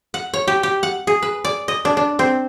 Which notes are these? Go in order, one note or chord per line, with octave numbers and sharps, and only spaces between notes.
F#5
C#5
G4
G4
F#5
G#4
B4
D5
D#5
D4
D4
C4